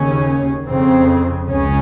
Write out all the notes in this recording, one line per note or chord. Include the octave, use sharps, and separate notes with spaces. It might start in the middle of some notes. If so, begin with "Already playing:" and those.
Already playing: D#2 C#3 C#4
F2 C#3 C4
C#2 C#3 C#4